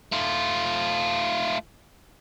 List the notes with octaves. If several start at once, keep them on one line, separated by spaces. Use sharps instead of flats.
A3 F4